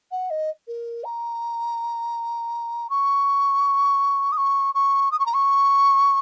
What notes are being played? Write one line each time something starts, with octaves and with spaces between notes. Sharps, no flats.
F#5
D#5
A#4
A#5
C#6
D#6
C#6
C#6
D#6
C#6
A#5
C#6